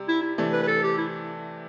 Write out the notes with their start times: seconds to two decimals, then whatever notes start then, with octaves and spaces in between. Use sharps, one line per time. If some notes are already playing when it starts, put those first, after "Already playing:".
Already playing: C3 G3
0.08 E4
0.22 E4
0.38 C3 E3 A3 D4
0.53 B4
0.63 B4
0.68 A4
0.83 G4
0.98 E4